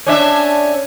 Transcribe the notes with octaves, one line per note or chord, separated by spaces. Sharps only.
C#4 D4 E5